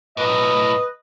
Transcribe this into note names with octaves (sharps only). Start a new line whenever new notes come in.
B1 A2 B4 D#5